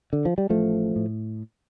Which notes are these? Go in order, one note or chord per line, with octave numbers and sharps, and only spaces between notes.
D3
F3
G3
A1 F3 A3
A2